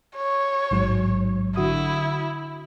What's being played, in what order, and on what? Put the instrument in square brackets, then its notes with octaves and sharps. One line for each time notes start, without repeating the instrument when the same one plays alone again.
[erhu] C#5
[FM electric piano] A1 G#2 F#3
[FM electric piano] D3 F#4 D#6 [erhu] E4